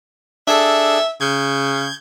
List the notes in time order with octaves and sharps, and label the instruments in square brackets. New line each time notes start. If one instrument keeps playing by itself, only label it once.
[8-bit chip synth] D4 G#4 A4 [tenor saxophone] E5
[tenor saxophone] C#3 [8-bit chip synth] G6 G#6